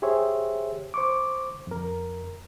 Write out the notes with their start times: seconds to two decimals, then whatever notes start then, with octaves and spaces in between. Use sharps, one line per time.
0.02 G4 G#4 C5 C#5 E5
0.94 C5 C#6 D6
1.67 F2 A#4